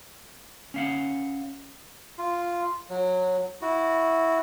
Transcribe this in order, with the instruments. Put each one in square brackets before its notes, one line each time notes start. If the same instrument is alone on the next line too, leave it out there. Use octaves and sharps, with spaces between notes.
[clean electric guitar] C#4 F5 F#5
[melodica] F4
F#3
E4 F#4